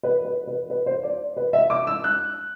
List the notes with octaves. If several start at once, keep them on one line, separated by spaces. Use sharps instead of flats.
B4
B4
B4
B4
C5
D5
B4
E5
D6
E6
F#6